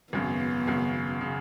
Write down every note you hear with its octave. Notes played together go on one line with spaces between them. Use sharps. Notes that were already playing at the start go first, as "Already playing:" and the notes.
G#1 F#2 C#3 B3
G#1 F#2 C#3
C#3